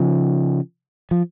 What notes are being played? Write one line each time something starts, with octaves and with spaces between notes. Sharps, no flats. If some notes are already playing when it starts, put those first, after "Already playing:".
Already playing: C#3 F3
F3